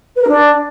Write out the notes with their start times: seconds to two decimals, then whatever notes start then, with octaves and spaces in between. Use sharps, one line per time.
0.16 B4
0.22 A#4
0.28 D4